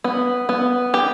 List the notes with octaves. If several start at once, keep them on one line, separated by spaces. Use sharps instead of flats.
B3
B3
G4